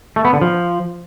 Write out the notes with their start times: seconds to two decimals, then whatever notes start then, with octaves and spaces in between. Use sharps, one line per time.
0.16 A3
0.25 B3
0.33 D3
0.41 F3